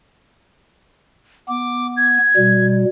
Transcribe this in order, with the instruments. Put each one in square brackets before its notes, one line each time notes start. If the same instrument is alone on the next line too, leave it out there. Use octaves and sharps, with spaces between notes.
[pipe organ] B3 [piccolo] D6
[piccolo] G#6
[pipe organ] B2 G3